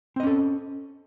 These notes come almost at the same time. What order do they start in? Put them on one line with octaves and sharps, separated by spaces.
C4 D#5 C#4 A4